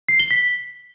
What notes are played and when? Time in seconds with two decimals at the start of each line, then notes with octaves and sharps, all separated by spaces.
0.09 C7
0.20 G7
0.31 B6